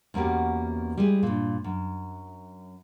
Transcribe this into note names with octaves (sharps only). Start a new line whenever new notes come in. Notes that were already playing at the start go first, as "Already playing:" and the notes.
E2 A#3 C#4 F#4 G4
G3 G#3 E4 G#4
G2 A#2
F#2